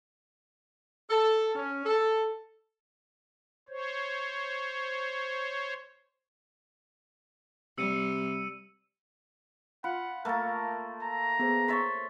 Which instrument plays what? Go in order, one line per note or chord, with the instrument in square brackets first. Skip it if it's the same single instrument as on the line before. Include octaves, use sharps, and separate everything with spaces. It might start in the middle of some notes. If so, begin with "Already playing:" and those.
[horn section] A4
C#4
A4
[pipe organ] C5 C#5
[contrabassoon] C3 [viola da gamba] G3 [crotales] E6 C#7 D#7
[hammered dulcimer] F4 [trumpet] F#5 [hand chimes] B5
[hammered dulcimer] A3 A#3 [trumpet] A#4 [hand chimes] B5 A6
[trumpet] A#5
[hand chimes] B3 G#4 C5
[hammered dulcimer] C5 C#5 E5 [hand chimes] C#6 A6 B6